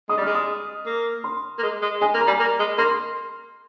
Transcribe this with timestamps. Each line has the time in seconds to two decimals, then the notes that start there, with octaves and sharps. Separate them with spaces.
0.09 G#3 D#6
0.18 G3
0.22 F6
0.26 G#3
0.35 D#6
0.86 A#3
1.24 C6
1.58 A#3
1.63 G#3
1.82 G#3
2.01 G#3 G#5
2.14 A#3
2.21 A#5
2.27 G3
2.40 A#3
2.60 G#3
2.78 A#3 C6